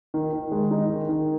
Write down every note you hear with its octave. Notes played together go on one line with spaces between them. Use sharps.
D#3
D#3
G#3
D#4
D#3
D#3